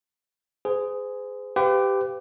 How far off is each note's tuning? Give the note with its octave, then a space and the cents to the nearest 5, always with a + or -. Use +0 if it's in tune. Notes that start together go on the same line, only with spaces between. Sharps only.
G#4 +0 C5 -40
G4 +0 B4 +40 F5 +0